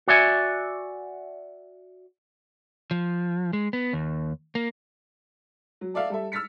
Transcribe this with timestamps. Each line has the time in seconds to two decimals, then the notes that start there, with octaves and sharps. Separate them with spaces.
0.08 F#4 D5 E5 G#5
2.91 F3
3.53 G#3
3.73 B3
3.93 D#2
4.55 A#3
5.81 F#3
5.94 A4 D5 E5 F5
6.10 G3 A4 E5
6.32 E6 F6 A6 B6 C#7